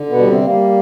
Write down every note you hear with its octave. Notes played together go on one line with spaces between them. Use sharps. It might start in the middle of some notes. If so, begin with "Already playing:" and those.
Already playing: D3
B2 B3
G3
C3 C4
G3 A#3